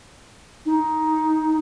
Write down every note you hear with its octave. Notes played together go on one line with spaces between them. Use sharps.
D#4